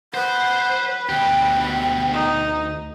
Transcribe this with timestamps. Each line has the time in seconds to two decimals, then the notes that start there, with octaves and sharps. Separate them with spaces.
0.14 B4 C5 F#5
1.09 D2 B2 G4 G5
2.13 D#4